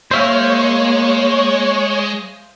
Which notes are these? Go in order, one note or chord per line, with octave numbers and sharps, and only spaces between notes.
G#3 A#3 C5 C#5 E5 F5